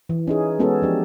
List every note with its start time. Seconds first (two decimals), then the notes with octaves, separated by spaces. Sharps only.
0.09 E3
0.27 C#4 D#4 G#4
0.59 G#3 B3 C#4 F#4 A4
0.82 F3 D4 G4